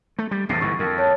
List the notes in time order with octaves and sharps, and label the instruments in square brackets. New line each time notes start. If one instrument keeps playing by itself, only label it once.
[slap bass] A3
G3
[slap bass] E2 A2 C3 [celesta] A6 C7
[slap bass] G1 G#2 E3 [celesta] C#6
[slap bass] F2 [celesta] A#4
[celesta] C#5 A5